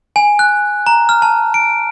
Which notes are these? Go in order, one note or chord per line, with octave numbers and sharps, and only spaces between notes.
G#5
F#6
A#5
F6
A5
D7